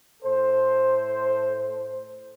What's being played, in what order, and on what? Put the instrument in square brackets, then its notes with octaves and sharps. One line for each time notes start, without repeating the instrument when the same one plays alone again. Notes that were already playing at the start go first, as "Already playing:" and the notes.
[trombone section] A2 A4 C5